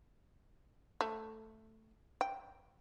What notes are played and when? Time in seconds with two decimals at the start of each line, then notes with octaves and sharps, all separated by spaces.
1.01 A3
2.21 G5